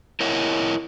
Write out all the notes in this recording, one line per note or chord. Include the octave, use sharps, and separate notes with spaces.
E4 A#4 C#5 D#5 F#5